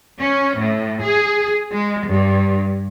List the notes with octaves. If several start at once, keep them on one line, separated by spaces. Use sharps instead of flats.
C#4
A2
G#4
G#3
G2